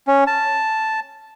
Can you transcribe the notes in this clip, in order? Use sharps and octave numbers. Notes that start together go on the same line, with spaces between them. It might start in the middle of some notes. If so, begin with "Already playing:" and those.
C#4
A5